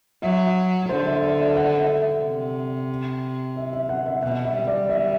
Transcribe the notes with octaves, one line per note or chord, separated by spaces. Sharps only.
F#3 E5
D3 C5
E5
D5
E5
F#5
E5
E5
C3
E5
E5
F#5
E5
B2 F#5
E5
G3
D5
E5